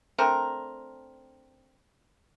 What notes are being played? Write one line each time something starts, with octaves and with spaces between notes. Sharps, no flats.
A3 C4 D4 A#4